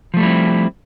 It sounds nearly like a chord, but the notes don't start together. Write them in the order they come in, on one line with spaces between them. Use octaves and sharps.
F3 A3 G3 E4 C4